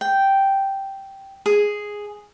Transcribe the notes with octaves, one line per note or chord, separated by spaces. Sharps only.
G5
G#4